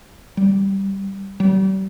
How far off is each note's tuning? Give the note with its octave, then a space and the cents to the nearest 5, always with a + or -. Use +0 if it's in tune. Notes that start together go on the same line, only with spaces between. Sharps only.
G3 -5
G3 -40